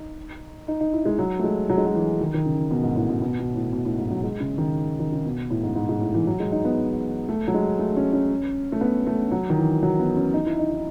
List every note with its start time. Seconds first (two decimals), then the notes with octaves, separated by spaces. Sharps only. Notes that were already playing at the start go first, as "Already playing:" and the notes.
Already playing: D#4
0.68 D#4
0.80 D#4
0.93 E4
1.05 G#3
1.19 F#3
1.39 A3
1.44 G#3
1.69 F#3
1.78 G#3
1.86 F#3
1.95 E3
2.21 D#3
2.34 D#3
2.46 C#3
2.71 B2
2.84 G#2
2.96 A2
3.09 B2
3.22 B2
3.39 B2
3.55 A2
3.73 B2
3.85 A2
3.98 G#2
4.11 F#3
4.24 G#3
4.40 C#3
4.58 D#3
4.99 D#3
5.12 C#3
5.26 B2
5.50 A2
5.63 G#2
5.75 G#2
5.89 G#2
6.01 A2
6.14 E3
6.27 F#3
6.40 G#3
6.52 D#4
6.65 B3
7.29 A3
7.47 F#3
7.54 G#3
7.79 A3
7.97 C#4
8.13 C#4
8.72 A3
8.81 B3
9.07 A3
9.31 F#3
9.50 D#3
9.57 E3
9.83 F#3
9.99 B3
10.16 C#4
10.34 D#4
10.46 E4
10.59 D#4
10.71 D#4